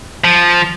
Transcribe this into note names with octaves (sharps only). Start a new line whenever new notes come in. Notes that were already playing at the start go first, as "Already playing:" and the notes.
F3